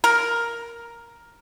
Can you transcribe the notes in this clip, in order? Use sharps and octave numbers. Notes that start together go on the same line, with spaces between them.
A#4